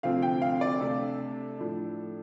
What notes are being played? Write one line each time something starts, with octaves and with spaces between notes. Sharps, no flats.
D2 C3 F3 C4 F5
G5
F5
D5
C3 A3 D4 A4
A2 F3 D4